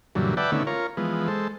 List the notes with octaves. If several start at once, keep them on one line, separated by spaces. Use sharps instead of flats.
F#2 A#2 D3 E3 F#3 G3
B4 D5 E5 F#5 G5 A5
D3 D#3 A3 B3 C#4 E4
F4 A#4 C#5
E3 F3 G#3 B3
G#3 A4 C5